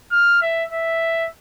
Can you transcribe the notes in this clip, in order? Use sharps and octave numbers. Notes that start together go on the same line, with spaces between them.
F6
E5
E5